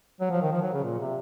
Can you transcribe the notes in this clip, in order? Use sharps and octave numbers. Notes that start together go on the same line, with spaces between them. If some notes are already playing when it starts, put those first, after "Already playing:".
F#3
F3
D#3
F3
F#3
C#3
A#2
C3